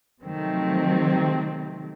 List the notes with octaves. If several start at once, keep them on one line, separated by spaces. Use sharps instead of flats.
C3 D#3 F3 F#3 A3 C4